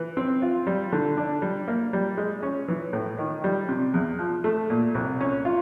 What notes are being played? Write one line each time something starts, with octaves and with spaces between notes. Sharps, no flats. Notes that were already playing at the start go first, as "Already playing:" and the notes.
Already playing: E3
C4
F4
G3
D3
D4
G3
A#3
G3
G#3
C#4
E3
A2
D#3
G3
C3
E2
F3
A3
A#2
C2
C#4
F4